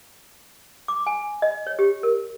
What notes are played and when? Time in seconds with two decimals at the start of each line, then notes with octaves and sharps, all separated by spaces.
0.88 D6
1.06 G#5
1.42 D#5
1.67 C#5
1.79 G4
2.03 A#4